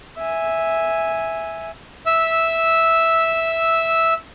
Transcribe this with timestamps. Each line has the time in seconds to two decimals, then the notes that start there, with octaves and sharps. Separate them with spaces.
0.18 E5 G#5
2.06 E5 E6